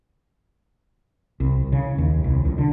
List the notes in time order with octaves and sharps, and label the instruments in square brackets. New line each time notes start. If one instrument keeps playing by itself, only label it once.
[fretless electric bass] C2
C#3
D#2
C2
C#2
D3